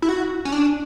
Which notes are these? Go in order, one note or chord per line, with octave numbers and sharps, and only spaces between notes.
E4
F#4
C#4
D4